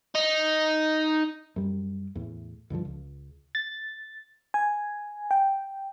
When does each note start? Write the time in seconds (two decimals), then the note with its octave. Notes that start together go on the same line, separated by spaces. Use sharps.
0.15 D#4
1.56 F#2 G3
2.15 E2 A2
2.70 C#2 G2 D3 F3
2.85 C#2
3.55 A6
4.54 G#5
5.31 G5